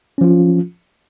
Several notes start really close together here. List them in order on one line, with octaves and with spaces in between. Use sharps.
C#4 F3 F4